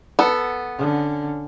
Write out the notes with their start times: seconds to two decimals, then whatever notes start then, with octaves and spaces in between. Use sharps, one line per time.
0.19 B3 A4
0.78 D3 C#4